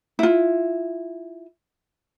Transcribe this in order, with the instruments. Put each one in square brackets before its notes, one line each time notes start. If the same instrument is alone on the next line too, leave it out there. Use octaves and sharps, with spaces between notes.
[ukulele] E4 F4